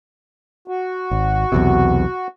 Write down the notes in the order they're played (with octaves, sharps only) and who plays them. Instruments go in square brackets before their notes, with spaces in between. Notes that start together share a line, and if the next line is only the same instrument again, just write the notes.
[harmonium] F#4
[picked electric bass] G#1
B1 E2 C3